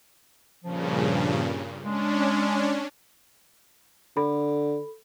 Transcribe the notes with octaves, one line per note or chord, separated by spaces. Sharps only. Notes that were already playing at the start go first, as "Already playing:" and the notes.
G2 A#2 C#3 F3
G#3 C#4 D4
D3 A4 B5